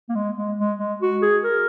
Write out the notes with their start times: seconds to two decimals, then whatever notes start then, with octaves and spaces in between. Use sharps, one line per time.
0.09 A#3
0.15 G#3
0.36 G#3
0.58 G#3
0.79 G#3
1.02 F#4
1.22 G#4
1.44 A#4